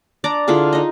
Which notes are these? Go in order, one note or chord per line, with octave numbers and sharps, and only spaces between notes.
D4 D5 A#5 D6
D3 E4 F4 G#4
D#4 D#5